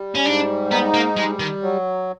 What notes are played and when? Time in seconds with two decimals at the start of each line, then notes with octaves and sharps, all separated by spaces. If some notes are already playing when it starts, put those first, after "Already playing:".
Already playing: G3
0.15 C#4
0.25 G#2 D4
0.71 B3 D#4
0.94 A#3
1.17 G3 G#3
1.40 D#3
1.63 F#3